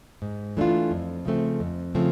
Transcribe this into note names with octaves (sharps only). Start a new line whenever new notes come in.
G#2
E3 A3 D4 F4
F2
C#3 F3 A3 C4
F2
C#3 F3 A3 C4